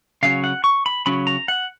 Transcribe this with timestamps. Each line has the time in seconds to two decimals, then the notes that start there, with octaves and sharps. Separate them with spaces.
0.23 C#3 F#3 C#4 F5
0.44 F#5
0.64 C#6
0.86 B5
1.06 C#3 F#3 C#4 B5
1.27 A#5
1.48 F#5